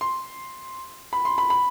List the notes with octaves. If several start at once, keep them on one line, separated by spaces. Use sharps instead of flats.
C6
B5
C6
B5
B5